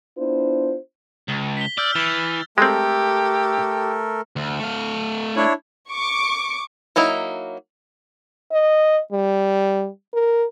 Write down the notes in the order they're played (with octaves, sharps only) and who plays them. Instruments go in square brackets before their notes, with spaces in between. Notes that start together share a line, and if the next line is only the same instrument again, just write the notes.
[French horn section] B3 D4 E4 F4 C5
[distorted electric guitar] C#2
[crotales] B6 G7
[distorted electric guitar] D5 [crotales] E6 F6 G6
[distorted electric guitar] E3 [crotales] A6 F7
[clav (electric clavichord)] G#3 C4 [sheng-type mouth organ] A3 A4 A#4 [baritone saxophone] G4
[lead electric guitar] D2
A3 F5
[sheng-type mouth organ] D4 E4 C#5
[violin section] C#6 D6
[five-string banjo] F#3 A#3 D#4 E4
[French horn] D#5
G3
A#4